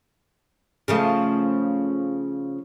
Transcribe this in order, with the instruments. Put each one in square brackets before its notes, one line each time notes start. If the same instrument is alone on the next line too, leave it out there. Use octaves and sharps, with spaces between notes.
[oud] C#3 F3 A3